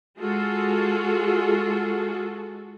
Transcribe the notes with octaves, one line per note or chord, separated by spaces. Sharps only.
G#3 F4 F#4 G#4 A4